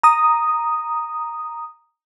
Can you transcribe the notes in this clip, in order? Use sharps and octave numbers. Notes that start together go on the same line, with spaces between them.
A#5 D#6